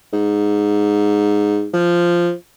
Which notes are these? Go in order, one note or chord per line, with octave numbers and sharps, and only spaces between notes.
G#2
F3